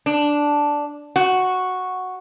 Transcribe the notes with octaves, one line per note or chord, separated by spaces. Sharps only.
D4
F#4